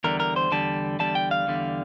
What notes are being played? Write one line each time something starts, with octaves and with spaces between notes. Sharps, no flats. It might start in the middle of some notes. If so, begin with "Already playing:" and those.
E2 D3 G3 A#4
A#4
C5
E2 D3 G3 A5
E2 D3 G3 A5
G5
F5
E2 D3 G3